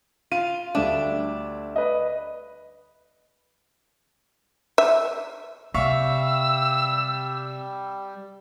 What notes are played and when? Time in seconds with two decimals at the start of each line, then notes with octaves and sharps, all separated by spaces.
0.32 F4 D#7
0.75 D2 G3 D4 E5
1.76 B4 D#5
4.78 E5
5.74 C3 G3 E5 F5 C#6 E6